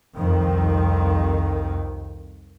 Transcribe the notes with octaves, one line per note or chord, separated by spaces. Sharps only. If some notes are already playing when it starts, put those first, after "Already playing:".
C2 F2 D#3